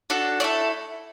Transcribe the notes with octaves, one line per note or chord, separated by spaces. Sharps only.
D4 F#4 A4
A3 E4 A4 D5